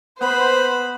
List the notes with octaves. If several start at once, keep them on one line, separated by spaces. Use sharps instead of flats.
B3 B4 C5 B5